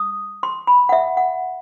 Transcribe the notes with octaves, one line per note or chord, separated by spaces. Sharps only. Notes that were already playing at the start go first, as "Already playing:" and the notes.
Already playing: D#6
C6
B5
F#5
E5
F#5